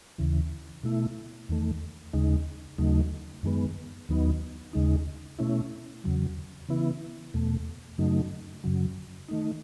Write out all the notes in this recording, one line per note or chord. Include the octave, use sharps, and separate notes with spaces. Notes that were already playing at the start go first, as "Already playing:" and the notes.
D#2 C#3 E3
B2 A3 E4
E2 D#3 A3
D#2 C#3 G#3 D#4
D#2 C#3 F#3 A3 D#4
F#2 D#3 G#3 B3
D#2 D#3 F#3 B3 D#4
D#2 C#3 G#3 D#4
B2 A3 C#4 E4
E2 C#3 F#3
C#3 E3 B3 E4
E2 B2 A3
F#2 C#3 F#3 A3 D#4
F#2 C#3 F#3
D#3 A3 D#4